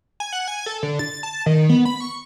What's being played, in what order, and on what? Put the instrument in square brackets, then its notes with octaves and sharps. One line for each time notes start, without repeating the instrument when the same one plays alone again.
[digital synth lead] G#5
F#5
G#5
A4
D3
A6
A5
D#3
B3
B5
C#6